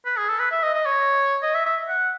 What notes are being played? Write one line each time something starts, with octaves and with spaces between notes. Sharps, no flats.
B4
G#4
A4
B4
E5
D#5
D#5
C#5
D#5
E5
E5
F#5